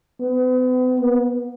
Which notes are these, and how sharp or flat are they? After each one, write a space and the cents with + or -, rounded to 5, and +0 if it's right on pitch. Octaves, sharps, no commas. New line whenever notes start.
B3 +40
B3 -35